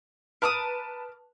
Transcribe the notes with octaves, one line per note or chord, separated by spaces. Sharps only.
A#4 B4 A5 D6 D#6